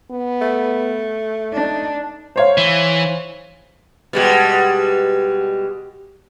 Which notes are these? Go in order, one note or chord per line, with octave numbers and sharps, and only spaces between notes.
B3
A3
D4 D#4
C5 C#5 F5
E3
B2 G3 G#3